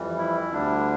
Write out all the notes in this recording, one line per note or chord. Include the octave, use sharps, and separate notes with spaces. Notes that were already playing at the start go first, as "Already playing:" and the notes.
Already playing: F2 E3 G3
E4
D2 D3 G3 D4